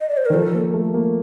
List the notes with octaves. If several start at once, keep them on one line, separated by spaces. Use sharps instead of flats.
D#5
D5
C5
A#4
D#3
F3 A4
A#3
A3
A#3